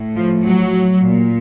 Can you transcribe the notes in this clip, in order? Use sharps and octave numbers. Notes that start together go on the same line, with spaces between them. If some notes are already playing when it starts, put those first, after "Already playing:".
Already playing: A2
F3
F#3
A#2